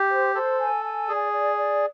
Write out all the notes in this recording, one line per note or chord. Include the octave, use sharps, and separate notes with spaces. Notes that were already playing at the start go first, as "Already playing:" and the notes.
Already playing: G4
C5
A4 C5
G#5
G#5
G#4 D5
D5
D5